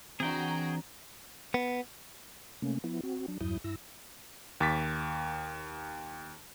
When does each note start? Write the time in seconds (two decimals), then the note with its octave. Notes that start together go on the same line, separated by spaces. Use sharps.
0.20 E3 C4 D4 F#4 G#4 G5 A#5
1.54 B3
2.62 C3 A3 A#3 C#4
2.84 F3 B3 E4
3.03 C4 F#4
3.28 F#3 D4
3.41 E2 G2 F#3 E4 D#6 G6
3.64 G2 E4 E6 A#6
4.61 D#2 C#6 D6 A6 B6